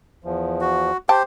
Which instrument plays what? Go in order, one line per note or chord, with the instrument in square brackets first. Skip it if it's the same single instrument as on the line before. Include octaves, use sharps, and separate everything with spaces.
[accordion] E2 F3
[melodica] F#4
[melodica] G4 C5 [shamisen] G5 A5